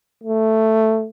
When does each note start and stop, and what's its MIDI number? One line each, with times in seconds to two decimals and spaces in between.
0.23 1.08 57